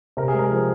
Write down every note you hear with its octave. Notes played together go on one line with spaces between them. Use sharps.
C3 A#4
G#4
G#3
A#4
F3